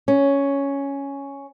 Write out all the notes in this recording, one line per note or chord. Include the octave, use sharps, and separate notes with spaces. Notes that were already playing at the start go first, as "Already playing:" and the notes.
C#4